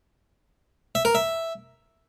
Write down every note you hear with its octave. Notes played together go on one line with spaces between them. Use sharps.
E5
A#4
E5